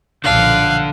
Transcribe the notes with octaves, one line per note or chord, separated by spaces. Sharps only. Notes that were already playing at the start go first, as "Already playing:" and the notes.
B1 A#2 D3 F3 D5 F5 A5 F#6